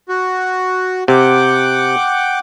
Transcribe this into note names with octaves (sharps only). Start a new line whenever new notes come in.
F#4
C3 F#5 G5 D6